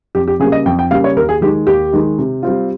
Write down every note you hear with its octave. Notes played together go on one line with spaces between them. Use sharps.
F2 G4
G4
C#3 G3 A#3 G#4
D#5
F2 G5
G5
C#3 G3 A#3 F5
C#5
D#2 A#4
G#4
D#3 G#3 D#4 G4
D#2 G4
D#3 G#3 D#4
C3
G3 C4 F4